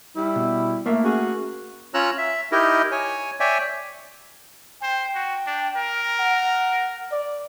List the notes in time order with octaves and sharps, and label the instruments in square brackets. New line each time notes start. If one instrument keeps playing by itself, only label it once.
[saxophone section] G3 E4
[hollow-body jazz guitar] B2
A3 A#3 E5
[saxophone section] C#4 F#4 G#4
[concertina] C#4 F4 C#5 A#5 E6 F#6
E5
D#4 E4 G4 A#4 D#5
C#5 G#5
C#5 D5 E5 G5 G#5
[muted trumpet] C5 [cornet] G5
[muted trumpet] F#4
D4
A#4
[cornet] F#5
D5